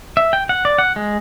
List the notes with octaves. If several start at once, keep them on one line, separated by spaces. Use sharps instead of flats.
E5
G5
F#5
D5
F#5
G#3